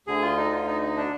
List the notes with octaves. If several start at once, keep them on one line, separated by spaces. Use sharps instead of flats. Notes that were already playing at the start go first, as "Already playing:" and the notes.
D2 D3 G#4
F4
D#4
F4
D#4
D#4
D4